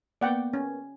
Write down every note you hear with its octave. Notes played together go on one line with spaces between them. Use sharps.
A#3 B3 D5 F#5 G5
C#4